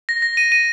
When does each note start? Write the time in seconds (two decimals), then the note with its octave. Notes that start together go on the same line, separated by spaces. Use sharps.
0.09 A#6
0.22 A#6
0.37 D#7
0.52 D#7